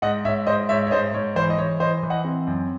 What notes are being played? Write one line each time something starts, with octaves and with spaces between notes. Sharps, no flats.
G#2 D#5 F#5
G#2 C#5 E5
G#2 C5 D#5
G#2 C#5 E5
C#5
G#2 C5 D#5
G#2 C#5
E3 C5
D#5
E3 C#5
E3 C5 D#5
E3
D#5 F#5
C4
F#2